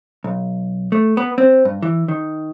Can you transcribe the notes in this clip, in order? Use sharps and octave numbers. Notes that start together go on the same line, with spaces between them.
B1
A3
B3
C4
G2
E3
D#3